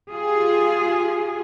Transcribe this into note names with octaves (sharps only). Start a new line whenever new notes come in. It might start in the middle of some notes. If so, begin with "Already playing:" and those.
F4 G4 G#4